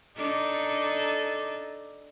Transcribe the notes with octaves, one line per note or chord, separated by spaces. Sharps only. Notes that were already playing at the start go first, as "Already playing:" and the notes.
D4 D#4 A4